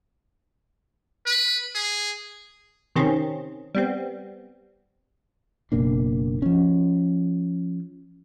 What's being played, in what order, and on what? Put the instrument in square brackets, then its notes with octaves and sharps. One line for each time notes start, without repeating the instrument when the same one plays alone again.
[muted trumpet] B4
G#4
[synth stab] C3 D#3 C4 C#4
G3 B3 C4
[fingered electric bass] F#1 B2 A#3 D4
F3 C#4